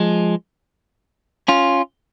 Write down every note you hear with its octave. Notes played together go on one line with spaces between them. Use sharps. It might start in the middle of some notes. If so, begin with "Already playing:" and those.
Already playing: F3 G#3
C#4 F4